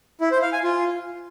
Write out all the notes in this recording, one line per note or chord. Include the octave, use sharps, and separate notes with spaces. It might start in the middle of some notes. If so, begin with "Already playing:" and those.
E4
C5
F5
G#5
F4